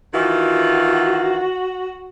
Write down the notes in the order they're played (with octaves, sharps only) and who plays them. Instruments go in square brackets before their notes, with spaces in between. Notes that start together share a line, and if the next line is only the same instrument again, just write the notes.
[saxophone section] D#3 E3 F4 [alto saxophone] F#4